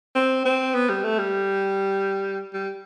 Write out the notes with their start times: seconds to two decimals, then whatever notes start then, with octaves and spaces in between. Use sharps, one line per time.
0.15 C4
0.45 C4
0.74 B3
0.89 G3
1.04 A3
1.18 G3
2.53 G3